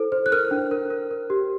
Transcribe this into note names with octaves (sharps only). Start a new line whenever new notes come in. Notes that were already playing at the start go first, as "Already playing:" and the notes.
Already playing: E4 A4 C5
C5
F#6
A#4 F6
D4
A#4
A#4
A#4
G4